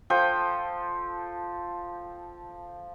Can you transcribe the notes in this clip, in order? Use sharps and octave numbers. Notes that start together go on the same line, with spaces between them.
F3 A4 G5